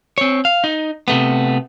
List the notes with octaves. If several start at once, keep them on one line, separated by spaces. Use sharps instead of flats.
C4 C#5
F5
D#4
C3 A3 B3